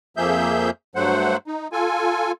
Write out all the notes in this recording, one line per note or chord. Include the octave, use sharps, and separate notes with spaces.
F2 F3 A#3 G#4 E5 G6
G2 F#3 A3 C5 F#5
D#4
F4 A4 G#5